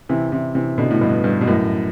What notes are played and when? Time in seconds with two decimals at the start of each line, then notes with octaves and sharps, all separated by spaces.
0.09 C3 E3
0.32 C3 E3
0.55 C3 E3
0.78 B2 D3
0.90 A2
1.01 G2 B2
1.24 G2
1.41 B2
1.47 F#2 A2